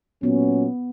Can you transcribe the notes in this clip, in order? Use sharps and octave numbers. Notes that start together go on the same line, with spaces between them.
A#2 F#3 B3 C#4